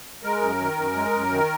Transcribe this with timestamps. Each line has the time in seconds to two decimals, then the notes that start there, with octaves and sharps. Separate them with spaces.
0.23 G#3 A#4
0.41 F#2
0.60 D#3
0.78 F#2
0.96 G#3
1.13 F#2
1.32 D#3